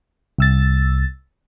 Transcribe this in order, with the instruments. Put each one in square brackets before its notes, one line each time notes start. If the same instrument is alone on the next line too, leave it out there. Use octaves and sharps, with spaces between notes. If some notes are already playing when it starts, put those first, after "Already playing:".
[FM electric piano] C2 E6 A6